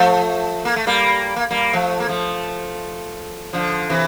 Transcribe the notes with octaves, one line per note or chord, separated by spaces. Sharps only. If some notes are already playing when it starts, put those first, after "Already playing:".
Already playing: F3 A3
A#3
A3
G3 A#3
A#3
G3 A#3
F3 A3
A#3
F3 A3
D3 F3
C3 E3